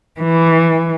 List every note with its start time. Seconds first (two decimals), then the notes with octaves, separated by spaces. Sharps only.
0.20 E3